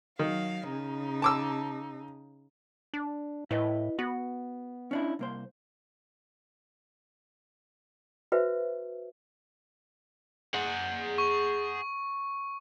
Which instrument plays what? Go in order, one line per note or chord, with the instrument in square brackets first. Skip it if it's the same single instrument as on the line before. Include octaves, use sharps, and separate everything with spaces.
[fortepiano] D#3 [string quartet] F#3 F5
[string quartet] C#3 D#4
[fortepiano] A5 D6 E6
[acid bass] D4
[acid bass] A2 [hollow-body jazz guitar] E4 B4 D#5
[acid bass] B3 [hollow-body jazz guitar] F#4
[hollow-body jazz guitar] C#4 D4 E4
C2 A#3 C5
[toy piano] F#4 B4 C5 E5 F5
[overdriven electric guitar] G#4 F#5
[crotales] C#6